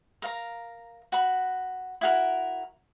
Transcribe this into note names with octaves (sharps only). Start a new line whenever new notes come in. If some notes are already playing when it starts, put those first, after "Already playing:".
A#4 F5 A#5
F#4 B5
E4 F#4 A#4